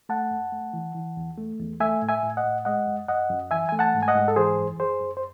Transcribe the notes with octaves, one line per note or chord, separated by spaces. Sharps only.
A3 F#5 A5
F#2
A3
E3
E3
E2
A3
E2
A3 E5 G#5
A2
E5 G#5
A2
D#5 F#5
A2
G#3 D#5 F#5
F#2
F#2 D#5 F#5
F#2
E3 E5 G#5
A3 G#5
F#5 A5
G#2
G#5
D#5 F#5
G#2
A4
E3 G#4 C5
F#2
F#2 G#4 C5
F#2
C5